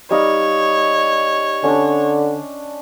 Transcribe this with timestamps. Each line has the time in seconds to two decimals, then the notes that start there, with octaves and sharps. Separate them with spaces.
0.11 G3 D#4 C#5 F5
1.64 D3 C#4 D4